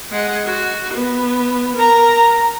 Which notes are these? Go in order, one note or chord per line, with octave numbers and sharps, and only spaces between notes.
G#3 F#5
F#4
B3
A#4 A#5